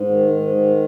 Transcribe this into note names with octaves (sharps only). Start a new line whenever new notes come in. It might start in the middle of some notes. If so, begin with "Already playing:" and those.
Already playing: G#2
D#3
G#2
D#3